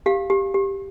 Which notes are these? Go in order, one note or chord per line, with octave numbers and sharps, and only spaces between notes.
G4 F5
G4
G4